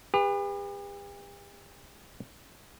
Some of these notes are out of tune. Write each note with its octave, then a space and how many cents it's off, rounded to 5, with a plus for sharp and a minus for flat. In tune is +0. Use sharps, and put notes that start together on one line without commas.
G4 +45 B4 +0